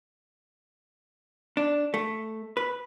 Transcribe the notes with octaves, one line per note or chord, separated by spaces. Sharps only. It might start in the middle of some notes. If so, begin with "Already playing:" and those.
D4
A3
B4